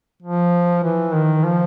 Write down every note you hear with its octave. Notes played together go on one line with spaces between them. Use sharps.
F3
E3
D#3
F3